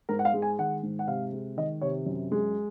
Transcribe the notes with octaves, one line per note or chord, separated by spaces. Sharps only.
G#2 A#4
F#5
F5
G#3
G#5
D#3 F#5
G#2
F#5
C3 F5
G#3
D#3 D#5
C3 C#5
F#2
G#3